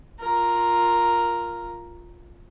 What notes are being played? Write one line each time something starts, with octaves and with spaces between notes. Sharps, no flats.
F4 A#4